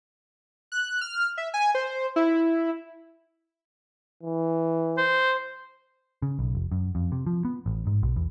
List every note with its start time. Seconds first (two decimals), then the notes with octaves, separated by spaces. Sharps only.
0.72 F#6
1.01 F6
1.38 E5
1.54 G#5
1.75 C5
2.16 E4
4.23 E3
4.98 C5
6.22 C#3
6.39 B1
6.55 F1
6.72 F#2
6.95 F2
7.12 C3
7.27 F3
7.45 B3
7.66 A1
7.87 G#2
8.03 B1
8.16 E2